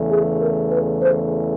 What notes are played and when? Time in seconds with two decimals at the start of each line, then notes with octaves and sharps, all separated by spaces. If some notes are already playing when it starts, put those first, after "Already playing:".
Already playing: E2 C#3 E3 A3
0.09 G#4
0.40 A#4
0.71 B4
1.02 C5